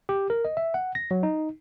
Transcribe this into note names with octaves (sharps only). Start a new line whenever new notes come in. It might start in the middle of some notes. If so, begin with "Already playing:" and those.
G4
A#4
D#5
E5
F#5
A#6
F#3
D#4